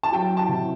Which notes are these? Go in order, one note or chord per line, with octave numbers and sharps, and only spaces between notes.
A5
F#3 G5
A5
C3